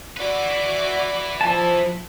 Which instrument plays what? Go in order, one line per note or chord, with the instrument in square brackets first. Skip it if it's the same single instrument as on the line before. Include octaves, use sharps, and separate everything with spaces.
[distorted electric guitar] E4 B4 [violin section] F#4 D5 D6
[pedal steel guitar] F3 A5